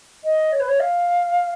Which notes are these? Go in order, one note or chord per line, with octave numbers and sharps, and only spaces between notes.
D#5
C#5
B4
C#5
F5